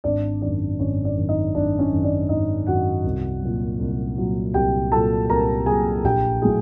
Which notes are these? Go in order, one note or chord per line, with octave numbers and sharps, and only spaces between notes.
G#1 D4 D5
F#2 D#3 D4 D5
G#1 C#4 C#5
D4 D5
F#2 D#3
D#4 D#5
G#1 D4 D5
C#4 C#5
F#2 D#3
D4 D5
G#1 D#4 D#5
F#2 D#3 F#4 F#5
C2
A#2 F#3
C2
A#2 F#3
C2 G4 G5
A#2 F#3 A4 A5
C2 A#4 A#5
A#2 F#3 G#4 G#5
A#1 G4 G5
A2 F#3 A3 G#4 G#5